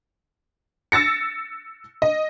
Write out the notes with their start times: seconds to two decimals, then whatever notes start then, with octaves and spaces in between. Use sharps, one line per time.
0.92 E6 A6 A#6 C#7
2.02 D#5